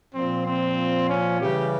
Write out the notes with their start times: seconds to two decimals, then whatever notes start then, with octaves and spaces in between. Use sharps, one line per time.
0.13 A#2 F3 C4
0.44 C4
1.08 C#4
1.39 C#3 E3 G3 G4